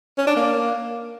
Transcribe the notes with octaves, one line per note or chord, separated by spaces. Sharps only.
C#4
D4
A#3